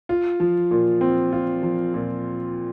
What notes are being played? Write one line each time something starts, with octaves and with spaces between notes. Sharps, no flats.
F4
F3
A#2
C4
F4
F3
A#2